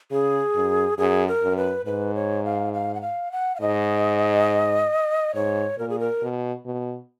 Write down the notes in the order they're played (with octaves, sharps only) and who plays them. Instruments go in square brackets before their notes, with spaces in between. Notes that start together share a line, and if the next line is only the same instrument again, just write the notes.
[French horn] C#3 [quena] G#4
[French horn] F#2
[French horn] F#2 [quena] G#4
[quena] A#4
[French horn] F#2
[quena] B4
[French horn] G#2 [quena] B4
[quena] C#5
F5
F5
F#5
F5
F#5
F5
[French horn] G#2 [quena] D#5
[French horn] G#2 [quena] C#5
[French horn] A#2 [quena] A#4
[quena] G#4
A#4
[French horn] B2
B2